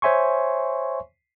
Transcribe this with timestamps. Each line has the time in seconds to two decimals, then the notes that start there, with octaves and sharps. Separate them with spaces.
0.02 C5 C#5 E5 G#5 C6 C#6